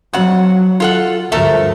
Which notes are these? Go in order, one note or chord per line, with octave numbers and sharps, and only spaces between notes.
F2 F#3 F#5
F4 A4 F#5
D2 G2 F3 A3 A4 A#4